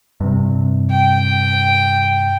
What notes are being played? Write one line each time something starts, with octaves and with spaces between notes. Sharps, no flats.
G2 C3
G5